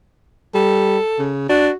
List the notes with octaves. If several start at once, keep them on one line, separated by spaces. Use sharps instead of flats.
G3 A4
C#3
D4 F#4